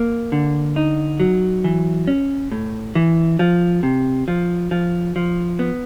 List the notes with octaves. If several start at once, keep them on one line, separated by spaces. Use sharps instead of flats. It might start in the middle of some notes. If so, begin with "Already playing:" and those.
Already playing: A#3
D3
D#4
F#3
E3
C#4
A2
E3
F3
C3
F3
F3
F3
B3